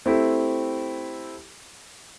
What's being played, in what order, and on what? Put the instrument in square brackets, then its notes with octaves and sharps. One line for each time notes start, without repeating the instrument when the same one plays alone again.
[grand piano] A3 C4 E4 G4